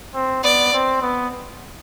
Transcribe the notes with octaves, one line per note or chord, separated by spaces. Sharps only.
C4
B3 D5
C4
B3